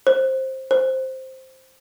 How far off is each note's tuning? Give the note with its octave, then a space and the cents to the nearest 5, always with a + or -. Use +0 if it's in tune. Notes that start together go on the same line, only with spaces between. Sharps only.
C5 +15
C5 +0